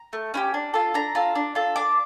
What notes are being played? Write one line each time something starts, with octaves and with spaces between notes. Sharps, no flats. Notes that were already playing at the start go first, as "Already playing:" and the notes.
Already playing: A#5
A3
C#4 E4 G4
D4
F4 A4
D4 A#5
F4 A4
D4
F4 A4
D4 D6